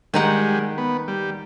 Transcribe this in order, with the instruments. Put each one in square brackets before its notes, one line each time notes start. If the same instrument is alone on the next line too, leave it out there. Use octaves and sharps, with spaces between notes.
[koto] D#3 D#4 F#5 [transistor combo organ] G3 G#3
[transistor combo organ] B3
G3